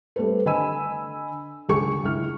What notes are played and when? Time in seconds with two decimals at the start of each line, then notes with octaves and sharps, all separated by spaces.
0.16 G3 A3 C4 A4 B4
0.46 D3 D#5 G#5 B5 E6 D#7
1.69 C#2 D3 G#4 C#6 C#7
2.03 C#2 E4 F6